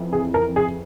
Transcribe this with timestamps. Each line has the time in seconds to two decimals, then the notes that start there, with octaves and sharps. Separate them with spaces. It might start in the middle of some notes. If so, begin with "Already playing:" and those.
Already playing: F2 E3
0.13 G#4
0.34 A#4
0.56 G#4